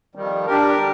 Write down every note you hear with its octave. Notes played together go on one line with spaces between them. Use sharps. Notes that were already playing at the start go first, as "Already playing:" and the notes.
F2 D#3 G3
G3 D4 G4 A#4
D3 G3